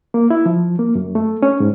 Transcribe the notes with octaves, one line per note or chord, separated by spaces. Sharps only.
A#3
E4
F3
A#3
F#2
A3
C#4
G#2